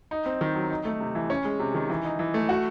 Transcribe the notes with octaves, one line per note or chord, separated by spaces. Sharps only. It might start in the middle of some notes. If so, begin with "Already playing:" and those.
D#4
C4
D#3
F#3
D#4
A3
C3
E3
C#4
G#3
C3
D#3
E3
D#4
E3
A3
F#4